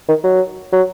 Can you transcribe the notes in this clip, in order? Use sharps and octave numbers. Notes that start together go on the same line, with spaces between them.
D#3
F#3
F#3